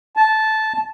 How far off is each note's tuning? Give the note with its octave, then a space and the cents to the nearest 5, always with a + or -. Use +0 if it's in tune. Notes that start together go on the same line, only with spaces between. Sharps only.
A5 -10